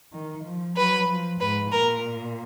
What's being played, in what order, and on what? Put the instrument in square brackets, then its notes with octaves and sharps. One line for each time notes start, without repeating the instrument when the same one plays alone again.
[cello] D#3
F3
[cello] F#3 [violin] B4
[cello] F3
[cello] G#2 [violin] B4
[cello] A#2 [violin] A#4